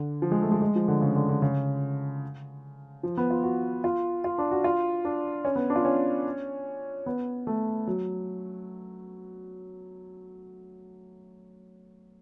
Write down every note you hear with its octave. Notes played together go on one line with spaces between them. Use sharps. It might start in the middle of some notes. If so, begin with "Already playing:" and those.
Already playing: D3
F3
G#3
A3
G#3
G#3
F3
D3
C#3
D3
D3
C#3
F3
B3
F4
F#4
F4
F4
D4
F#4
F4
D4
C#4
B3
D4
F4
C#4
B3
A3
F#3